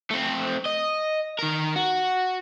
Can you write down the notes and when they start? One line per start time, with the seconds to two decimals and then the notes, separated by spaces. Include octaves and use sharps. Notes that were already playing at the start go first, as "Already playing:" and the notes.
0.11 A3 C4
0.66 D#5
1.39 D#3 A#4
1.76 F#4